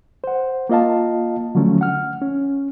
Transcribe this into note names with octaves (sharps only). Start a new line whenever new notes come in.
C5 F#5
A#3 F4 D#5 F5 A5
D3 F3 F#3 A3 C#4
F#5 F6
C#4